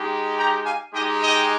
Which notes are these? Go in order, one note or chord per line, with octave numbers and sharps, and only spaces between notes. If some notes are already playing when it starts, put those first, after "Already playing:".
Already playing: G#3 D#4 G4
G5 A#5
F5 G#5
G#3 D#4 G4 D#5 G5
D#5 G5